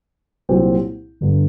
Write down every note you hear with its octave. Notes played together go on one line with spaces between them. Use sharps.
C2 A#2 F#3 C4 G4
G1 G2 D3 G3